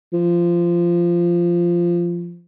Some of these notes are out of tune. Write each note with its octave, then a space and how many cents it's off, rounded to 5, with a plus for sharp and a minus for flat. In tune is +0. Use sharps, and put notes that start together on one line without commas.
F3 -15